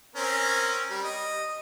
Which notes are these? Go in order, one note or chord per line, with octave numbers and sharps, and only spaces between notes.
C4 C#4 A#4
G3
D#5